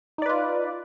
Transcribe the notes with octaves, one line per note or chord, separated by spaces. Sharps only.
D#4 F4 B4 D5